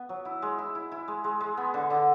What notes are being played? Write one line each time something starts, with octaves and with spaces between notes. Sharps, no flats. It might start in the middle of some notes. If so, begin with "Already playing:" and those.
Already playing: B3
F#3
E4
G#3
E4
E4
E4
G#3
G#3
G#3
B3
D3
D3